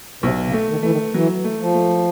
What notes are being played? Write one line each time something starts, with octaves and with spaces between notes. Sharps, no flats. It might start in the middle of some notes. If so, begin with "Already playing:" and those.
B1 C3
C#3
A3
D#3
E3 A3
D#3
E3 F#3
A3
F3
A3